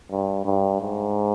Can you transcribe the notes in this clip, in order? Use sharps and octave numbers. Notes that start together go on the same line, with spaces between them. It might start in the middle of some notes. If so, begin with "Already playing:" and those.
G2
G2
G#2